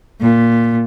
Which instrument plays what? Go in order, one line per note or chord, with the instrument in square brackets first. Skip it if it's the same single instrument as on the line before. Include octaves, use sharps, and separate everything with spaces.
[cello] A#2